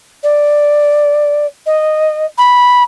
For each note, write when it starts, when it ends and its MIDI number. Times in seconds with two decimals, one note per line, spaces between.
0.24 1.47 74
1.66 2.26 75
2.38 2.83 83